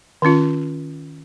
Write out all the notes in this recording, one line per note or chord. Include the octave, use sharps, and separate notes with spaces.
D#3 C#4 F4